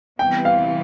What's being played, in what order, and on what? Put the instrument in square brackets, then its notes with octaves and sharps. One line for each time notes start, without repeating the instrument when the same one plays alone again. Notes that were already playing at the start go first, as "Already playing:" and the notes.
[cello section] C3 E3 G3 B3 [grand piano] G5
[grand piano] F5